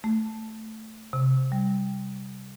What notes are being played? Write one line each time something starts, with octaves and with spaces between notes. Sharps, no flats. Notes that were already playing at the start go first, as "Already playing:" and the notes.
A3
C3
G3